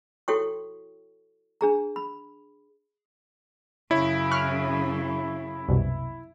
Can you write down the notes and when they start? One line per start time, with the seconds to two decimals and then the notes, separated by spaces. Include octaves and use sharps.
0.28 E4 F#4 A4 C#5 G5 C#6
1.61 D4 G#4 A#5
1.96 B5
3.91 F#2 C#3 E4 C#5
4.31 C#6 F6 F#6
5.68 C2 F#2 B2